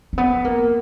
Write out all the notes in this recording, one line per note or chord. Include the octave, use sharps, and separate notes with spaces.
A#3
B3
A#3